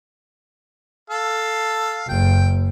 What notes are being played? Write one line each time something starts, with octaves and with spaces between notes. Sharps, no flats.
A4 F5
F#1 G5